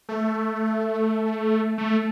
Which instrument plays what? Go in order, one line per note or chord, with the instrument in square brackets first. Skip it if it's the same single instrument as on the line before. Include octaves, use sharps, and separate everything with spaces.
[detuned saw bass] A3
A3